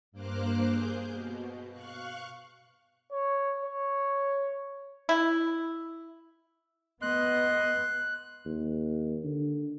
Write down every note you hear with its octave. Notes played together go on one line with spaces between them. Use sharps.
G2 A#3 C5 D6 F6 F#6
G#4 G6
B2
F5 C#6 F#6
C#5
C#5
E4
B3 D#5 C6 F#6
D#2
D3